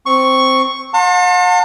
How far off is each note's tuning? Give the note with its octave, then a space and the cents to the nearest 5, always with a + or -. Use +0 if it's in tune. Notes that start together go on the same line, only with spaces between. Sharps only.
C4 +0 C#6 +0
F#5 -45 A5 +35 C6 +35